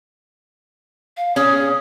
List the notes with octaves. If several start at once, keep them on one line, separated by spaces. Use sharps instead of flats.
F5
C#4 G#4 D#6